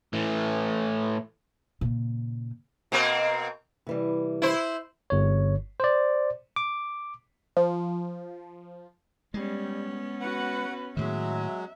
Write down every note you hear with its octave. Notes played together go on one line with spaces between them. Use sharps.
A2 E3
A#2 C#3
B2 A#3 C4
C3 E3 G3
E4 C5
G1 C#5
C5 D5
D6
F3
G3 G#3 B3 C#4
F#4 B4 F#5
A2 D#3 F#3 G#3 E5